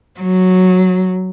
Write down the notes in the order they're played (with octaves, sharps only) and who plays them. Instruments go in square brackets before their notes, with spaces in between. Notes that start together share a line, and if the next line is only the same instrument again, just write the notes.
[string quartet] F#3